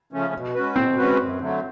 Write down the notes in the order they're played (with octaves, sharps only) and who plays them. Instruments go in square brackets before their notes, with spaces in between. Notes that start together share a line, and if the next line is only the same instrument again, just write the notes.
[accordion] C#3 F3 A3 C#4
B2
G#3 C#4 F#4 B4
[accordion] B2 [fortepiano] C4
[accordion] G#3 C#4 F#4 B4
F#2
D3 F#3 A3